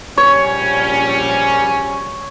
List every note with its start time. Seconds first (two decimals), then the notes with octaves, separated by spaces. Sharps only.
0.17 A#1 G3 C#4 C#5